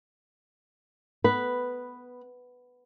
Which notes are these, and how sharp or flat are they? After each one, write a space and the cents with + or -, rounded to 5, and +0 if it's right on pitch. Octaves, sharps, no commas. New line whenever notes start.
B3 +5 B4 +0